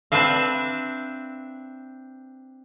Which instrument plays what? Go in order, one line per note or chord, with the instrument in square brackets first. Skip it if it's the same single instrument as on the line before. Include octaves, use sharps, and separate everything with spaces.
[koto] C4 D4 B4 E5 F5